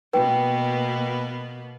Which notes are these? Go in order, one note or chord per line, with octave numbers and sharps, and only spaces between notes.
B2 A#3 B3 B4 G5